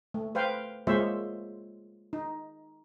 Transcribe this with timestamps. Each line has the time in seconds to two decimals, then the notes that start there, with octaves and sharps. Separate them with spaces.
0.14 A3
0.35 B4 C5 F5 G5
0.87 G#3 A#3 F4 C5 C#5 E5
2.13 D#4